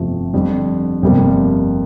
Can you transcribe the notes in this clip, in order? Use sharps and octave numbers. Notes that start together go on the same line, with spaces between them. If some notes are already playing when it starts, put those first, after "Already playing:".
Already playing: G1 F2 C3 F3 A3
F2 D3 G3
G1 F2 C3 G3 A#3